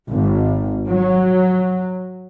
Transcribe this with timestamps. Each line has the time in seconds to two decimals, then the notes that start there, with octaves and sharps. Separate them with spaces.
0.10 G#1
0.88 F#3